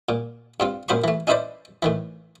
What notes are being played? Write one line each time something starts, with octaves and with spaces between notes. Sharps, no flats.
A#2
G2 C4 F4
F#2 A#2 C5 B5 C#6
E3 A3
C#4 D#4 E4 B4 C5 D5
A2 D#3 E3